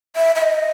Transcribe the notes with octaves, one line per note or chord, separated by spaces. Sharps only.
E5
E5
D#5